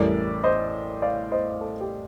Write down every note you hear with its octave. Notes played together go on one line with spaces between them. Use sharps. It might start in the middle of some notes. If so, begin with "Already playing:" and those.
Already playing: A1 A2 G3 A#4 D5
C5 D#5
D5 F5
C5 D#5
A4
G4